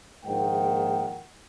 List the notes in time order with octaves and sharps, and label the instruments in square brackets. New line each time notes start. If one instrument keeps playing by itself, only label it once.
[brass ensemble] A#1 G#2 D#3 A#3 F#5 G5